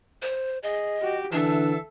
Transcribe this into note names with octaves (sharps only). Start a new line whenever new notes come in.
C5
G#4 D#5
F#4 G4
D3 E3 D4 A4 E5